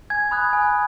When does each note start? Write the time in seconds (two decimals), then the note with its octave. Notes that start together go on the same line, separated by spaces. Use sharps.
0.10 G#5 G#6
0.31 B5 D#6 F#6
0.53 G#5